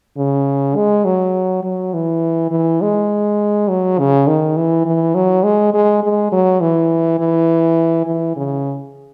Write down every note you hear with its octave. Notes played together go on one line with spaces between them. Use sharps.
C#3
G#3
F#3
F#3
E3
E3
G#3
F#3
C#3
D#3
E3
E3
F#3
G#3
G#3
G#3
F#3
E3
E3
E3
C#3